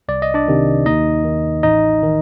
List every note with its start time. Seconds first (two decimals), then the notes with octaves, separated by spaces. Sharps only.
0.08 C2 D5
0.22 D#5
0.34 D4 D5
0.48 C3 D#3
0.86 D#2 D#4 D#5
1.25 D#3
1.63 A1 D#4 D#5
2.02 D#3